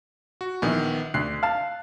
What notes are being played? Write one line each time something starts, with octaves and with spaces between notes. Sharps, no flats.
F#4
A#1 D#3 E3 B3
D2 F#6 C7
F5 A5